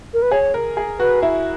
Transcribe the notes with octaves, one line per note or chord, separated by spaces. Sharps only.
A#4
B4
G#4 C#5
A#4
G#4
F#4 B4
E4